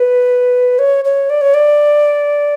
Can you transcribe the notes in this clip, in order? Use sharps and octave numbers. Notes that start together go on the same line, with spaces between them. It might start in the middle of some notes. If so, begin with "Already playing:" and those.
Already playing: B4
C#5
C#5
D5
C#5
D5